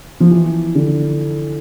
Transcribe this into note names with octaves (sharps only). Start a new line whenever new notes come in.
F3
E3
D3